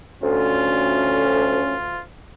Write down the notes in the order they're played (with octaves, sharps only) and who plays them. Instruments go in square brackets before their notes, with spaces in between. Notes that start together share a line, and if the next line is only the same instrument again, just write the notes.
[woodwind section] D2 [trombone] C#4 [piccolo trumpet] F4